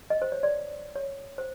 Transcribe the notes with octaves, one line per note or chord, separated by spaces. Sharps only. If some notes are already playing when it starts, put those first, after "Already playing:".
D#5
C5
C#5
D5
C#5
C5